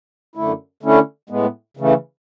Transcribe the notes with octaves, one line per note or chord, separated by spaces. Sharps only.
F#2 D3 A3 E4
D3 A3 C#4 E4
A2 G#3 B3
C#3 E3 A3